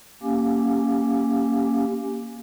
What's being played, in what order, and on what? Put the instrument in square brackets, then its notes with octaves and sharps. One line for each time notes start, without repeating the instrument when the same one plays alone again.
[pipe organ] A#3 C#4 G4